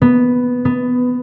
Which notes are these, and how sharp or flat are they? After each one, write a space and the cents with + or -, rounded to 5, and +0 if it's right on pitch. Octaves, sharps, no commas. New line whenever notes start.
B3 +0
B3 +15